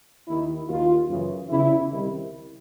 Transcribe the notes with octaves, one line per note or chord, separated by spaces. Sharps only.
D#2 D#3 E4
D#2 D#3 F4
F#2 C#3 E3
E2 C#3 E3 E4
C2 C3 D#3